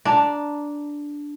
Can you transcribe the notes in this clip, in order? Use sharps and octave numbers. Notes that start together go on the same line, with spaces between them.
D4 A5 A#5